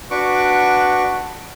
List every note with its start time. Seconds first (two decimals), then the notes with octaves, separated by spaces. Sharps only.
0.11 D4 F#4 B4 C#6 D6